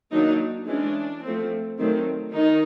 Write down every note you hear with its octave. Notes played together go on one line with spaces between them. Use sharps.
D#3 F#3 A#3 D4 D#4
E3 G#3 C#4 D4
F3 A3 C4
D#3 F#3 A3 C4
D#3 D#4